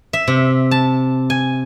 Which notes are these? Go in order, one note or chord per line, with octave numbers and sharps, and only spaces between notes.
E5
C3
A5
G#5